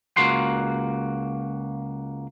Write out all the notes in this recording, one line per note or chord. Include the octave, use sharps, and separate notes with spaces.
C#2 A#3 F#4 C6